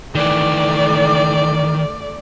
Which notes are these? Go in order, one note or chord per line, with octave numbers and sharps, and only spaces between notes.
D#3 E3 A3 D5